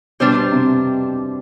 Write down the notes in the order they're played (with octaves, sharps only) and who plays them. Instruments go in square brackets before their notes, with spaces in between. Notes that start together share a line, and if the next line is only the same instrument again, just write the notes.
[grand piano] B2 [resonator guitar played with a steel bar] G3 D4 G4 C5
[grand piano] C3